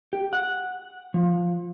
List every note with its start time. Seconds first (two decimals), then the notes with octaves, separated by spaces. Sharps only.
0.13 G4
0.33 F#5
1.14 F3